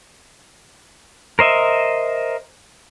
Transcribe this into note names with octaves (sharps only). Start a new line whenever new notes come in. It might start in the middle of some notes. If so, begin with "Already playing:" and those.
A#4 C5 D#5 E5